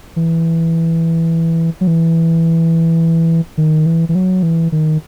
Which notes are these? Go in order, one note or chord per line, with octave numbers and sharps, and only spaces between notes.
E3
F#3
E3
D#3
E3
E3
F#3
E3
D#3